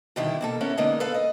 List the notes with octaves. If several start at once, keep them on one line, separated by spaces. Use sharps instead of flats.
B2 D3 D#3 G3 E4
B2 A#3 A4
B3 C#4 E4 A#4
D3 G#3 A#3 B3 D#4
A4 B4 F5
D#5